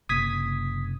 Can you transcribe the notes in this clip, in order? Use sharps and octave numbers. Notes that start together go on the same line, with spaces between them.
F#1 C3 A#3 D#6 G#6 B6